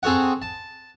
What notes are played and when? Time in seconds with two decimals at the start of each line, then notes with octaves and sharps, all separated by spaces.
0.03 C4 G#4 A4 C#5 F#5
0.42 A5